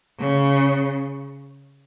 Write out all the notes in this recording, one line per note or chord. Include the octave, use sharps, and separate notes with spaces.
C#3